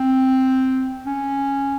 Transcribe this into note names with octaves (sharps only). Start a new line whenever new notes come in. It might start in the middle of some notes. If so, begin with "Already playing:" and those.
Already playing: C4
C#4